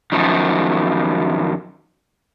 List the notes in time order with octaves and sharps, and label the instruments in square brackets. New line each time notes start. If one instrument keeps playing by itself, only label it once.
[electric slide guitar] F#2 D#3 F3